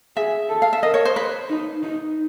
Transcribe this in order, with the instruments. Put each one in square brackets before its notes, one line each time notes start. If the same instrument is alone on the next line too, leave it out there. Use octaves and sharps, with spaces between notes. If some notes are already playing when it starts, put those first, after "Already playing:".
[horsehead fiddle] G#4 [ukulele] E5
[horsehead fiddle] A4
[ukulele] F5
E5
[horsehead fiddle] A#4 [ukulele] D#5
[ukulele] C#5
C5
B4
[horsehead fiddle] D#4
D#4